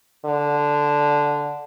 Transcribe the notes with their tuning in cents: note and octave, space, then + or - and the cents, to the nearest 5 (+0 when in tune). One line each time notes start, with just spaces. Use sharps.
D3 -5